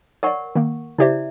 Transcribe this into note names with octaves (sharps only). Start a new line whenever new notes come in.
A#4 C#5 D5 F#5 C#6
D#3 A#3
C#3 E4 G4 C5 D5 E5